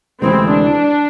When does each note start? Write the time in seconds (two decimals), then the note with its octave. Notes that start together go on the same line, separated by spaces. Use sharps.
0.22 D2 C3 E3 G#3 C4
0.52 D4